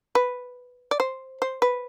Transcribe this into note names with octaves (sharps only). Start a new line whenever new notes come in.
B4
D5
C5
C5
B4